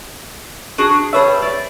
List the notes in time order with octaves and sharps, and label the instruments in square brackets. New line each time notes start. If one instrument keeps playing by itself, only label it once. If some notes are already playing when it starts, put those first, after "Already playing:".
[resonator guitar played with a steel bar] D4 F#4 G#4
[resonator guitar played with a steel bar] G3 G#4 A5 [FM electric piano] B4 C#5 E5
[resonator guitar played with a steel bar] D5